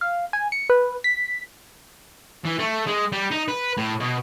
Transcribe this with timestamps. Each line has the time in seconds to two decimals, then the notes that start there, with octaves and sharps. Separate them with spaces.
0.01 F5
0.33 G#5
0.52 C#7
0.69 B4
1.04 B6
2.45 E3
2.59 A3
2.87 G#3
3.12 G3
3.31 D#4
3.48 B4
3.77 A2
4.00 B2